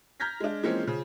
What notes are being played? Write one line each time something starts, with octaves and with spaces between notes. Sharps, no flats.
A#5 F6 G6 G#6 A#6 B6
G#3 D4
E3 F3 G#3 A#3 C4 C#4
C#3 F3